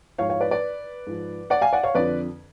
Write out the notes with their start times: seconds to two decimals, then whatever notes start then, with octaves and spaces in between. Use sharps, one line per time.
0.18 G#2 F3 C#5 F5
0.29 C#5 F5
0.40 B4 D5
0.51 B4 D5
1.07 G#2 F3
1.50 D5 F#5
1.61 F5 G#5
1.73 D5 F#5
1.83 C#5 F5
1.95 F2 D3 F3 B4 D5